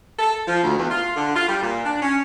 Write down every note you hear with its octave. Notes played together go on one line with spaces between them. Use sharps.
A4
F3
D2
E2
F4
D3
F4
G3
A#2
D4
C#4